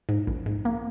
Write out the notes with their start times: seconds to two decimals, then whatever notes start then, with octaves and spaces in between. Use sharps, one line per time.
0.09 G#2
0.27 A#1
0.46 G#2
0.65 A#3